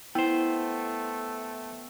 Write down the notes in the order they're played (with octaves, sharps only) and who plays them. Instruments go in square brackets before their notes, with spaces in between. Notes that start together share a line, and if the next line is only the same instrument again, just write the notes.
[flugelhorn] A3 [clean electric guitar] B3 C5 [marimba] E4 [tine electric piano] G5